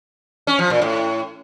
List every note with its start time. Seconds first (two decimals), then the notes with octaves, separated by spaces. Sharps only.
0.47 C#4
0.59 F3
0.70 A#2
0.82 A2